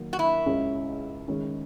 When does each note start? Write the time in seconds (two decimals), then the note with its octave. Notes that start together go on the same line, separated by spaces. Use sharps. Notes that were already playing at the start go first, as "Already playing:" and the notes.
Already playing: D#3 F#3 A#3
0.13 F#4
0.19 E4
0.46 C#2 C#3 G#3 C#4
1.28 D#3 G#3 C#4